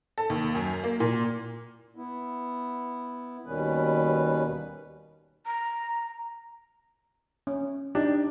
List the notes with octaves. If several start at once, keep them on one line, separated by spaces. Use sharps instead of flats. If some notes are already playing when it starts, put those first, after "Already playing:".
A4
D#2
F#2
A#3
A#2
B3 E4
D#2 B2 D#3 G3 C#4 B4
A#5
C#4
D4 D#4 G4